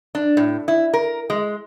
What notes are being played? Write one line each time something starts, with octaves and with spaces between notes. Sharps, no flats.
D4
A2
E4
A#4
G#3